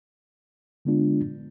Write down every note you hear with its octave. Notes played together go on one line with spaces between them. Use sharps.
D3 G#3 B3 D4 F4